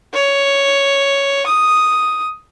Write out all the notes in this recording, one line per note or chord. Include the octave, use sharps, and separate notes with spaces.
C#5
D#6